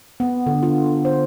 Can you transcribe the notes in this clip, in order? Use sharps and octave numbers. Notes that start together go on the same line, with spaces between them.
B3
D3
F4
C5